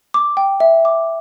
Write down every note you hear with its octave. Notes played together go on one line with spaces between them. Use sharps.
D6
G5
E5
D6